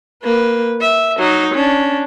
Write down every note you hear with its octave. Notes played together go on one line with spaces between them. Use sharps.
A#3 B4
E5
F#3 D#4
C#4 D4